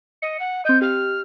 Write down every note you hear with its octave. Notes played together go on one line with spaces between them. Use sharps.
D#5 C#7
F#5
C4 D#5 G6
G4 F6